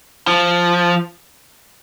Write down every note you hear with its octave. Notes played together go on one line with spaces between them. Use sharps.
F3